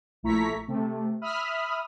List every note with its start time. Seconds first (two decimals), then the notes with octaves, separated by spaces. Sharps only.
0.23 A#1 A3 E4 A#5 C#6 B6
0.68 C3 A3
1.22 E5 B5 D#6 F6